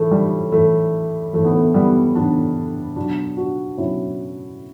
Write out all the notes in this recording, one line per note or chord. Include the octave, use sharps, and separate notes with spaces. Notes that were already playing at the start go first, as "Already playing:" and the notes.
Already playing: A2 E3 A3
G3
A2 E3 A3
A2 E3 A3
B3
A3
G3 B3
A2 E3 B3 D4
B2 F#3 D4 F#4
D4 F#4
B2 F#3 C#4 E4